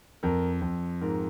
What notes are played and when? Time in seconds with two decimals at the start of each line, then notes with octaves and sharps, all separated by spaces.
0.23 F2 A#4
0.62 F2
1.01 G#2 A#4